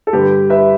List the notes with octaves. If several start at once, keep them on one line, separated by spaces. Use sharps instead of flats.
A4
G2 D3 G3 G4 B4
B4 E5